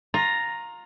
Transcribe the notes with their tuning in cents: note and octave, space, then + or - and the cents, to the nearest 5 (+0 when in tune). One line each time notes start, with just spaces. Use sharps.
F4 +20 A#5 +0